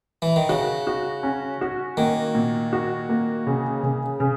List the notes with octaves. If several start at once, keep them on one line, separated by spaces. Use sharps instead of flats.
E3
D#3
C#3 F#4
F#4
C#4
F#4
D#3 A#3
A#2
F#4
A#3
C#3
C#3
C#3